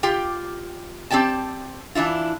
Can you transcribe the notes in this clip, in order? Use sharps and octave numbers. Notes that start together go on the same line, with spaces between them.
F4 G4 G5
C4 G4 D5 G5 A5
E3 D4 E4 F4